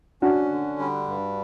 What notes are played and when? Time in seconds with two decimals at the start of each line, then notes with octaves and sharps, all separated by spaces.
0.22 C#4 D4 F#4
0.51 D3
0.79 G3
1.08 G2